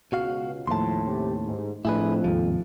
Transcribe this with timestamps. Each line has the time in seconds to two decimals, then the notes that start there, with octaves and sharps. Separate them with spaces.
0.12 C#2 B2 F#4 F5
0.67 D#2 A2 F3 A5 C6
1.05 C3 C#4 G4
1.45 G#2
1.85 F2 A2 D4 E4 G#4 B4
2.24 D#2 G#2 C3 F3